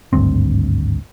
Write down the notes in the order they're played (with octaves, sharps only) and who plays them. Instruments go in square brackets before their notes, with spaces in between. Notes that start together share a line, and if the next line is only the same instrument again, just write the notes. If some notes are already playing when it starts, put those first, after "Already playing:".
[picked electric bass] G#1 D2 G2 C4